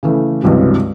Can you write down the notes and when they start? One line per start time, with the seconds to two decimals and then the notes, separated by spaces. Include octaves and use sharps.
0.03 C#3 E3 A3
0.42 C#2 G2 C3 E3 F#3